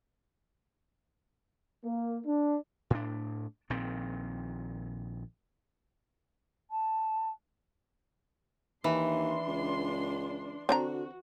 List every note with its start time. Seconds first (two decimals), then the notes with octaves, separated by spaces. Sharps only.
1.84 A#3
2.27 D4
2.90 A2 D4
3.70 A#1 A#2 D#3 C4
6.71 A5
8.84 D#2 E3 D4 C6
9.47 C#2
10.69 D3 C4 D4 F#4 A#5